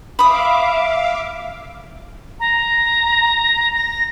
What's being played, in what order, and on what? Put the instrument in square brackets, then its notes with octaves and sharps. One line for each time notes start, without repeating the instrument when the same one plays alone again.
[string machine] E5 F5 D6 [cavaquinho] B5 D#6
[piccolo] A#5
A#6